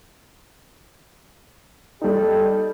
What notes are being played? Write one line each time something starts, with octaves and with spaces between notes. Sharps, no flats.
G3 D#4 G4 A4